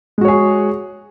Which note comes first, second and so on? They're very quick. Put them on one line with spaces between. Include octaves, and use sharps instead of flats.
G#3 F#4 C#5 G#4